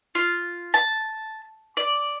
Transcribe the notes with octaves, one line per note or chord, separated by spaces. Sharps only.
F4
A5
D5